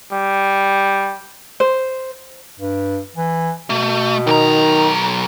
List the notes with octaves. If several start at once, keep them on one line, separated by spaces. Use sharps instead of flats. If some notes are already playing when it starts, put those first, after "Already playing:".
G3
C5
G2
E3
B2 A3
B1 D#3 A#5